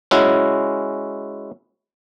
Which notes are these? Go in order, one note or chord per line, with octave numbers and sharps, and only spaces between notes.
G#3 C#4 E4 F#4